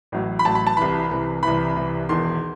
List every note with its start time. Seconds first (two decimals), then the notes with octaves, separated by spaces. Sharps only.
0.12 A1 A2 F#3
0.39 B5
0.45 A1 A2 F#3 A5
0.55 B5
0.67 A5
0.77 C2 C3 E3 B5
1.11 C2 C3 E3
1.43 C2 C3 E3 B5
1.76 C2 C3 E3
2.09 E1 E2 D#3 C6